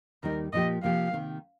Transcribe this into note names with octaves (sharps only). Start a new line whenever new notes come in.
D#2 D#3 G3 D#4 A#4
A#2 F3 A#3 G4 D#5
C3 F3 A#3 G4 F5
C3 D#3 C4